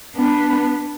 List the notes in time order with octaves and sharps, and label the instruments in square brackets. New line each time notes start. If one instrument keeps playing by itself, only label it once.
[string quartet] B3 D4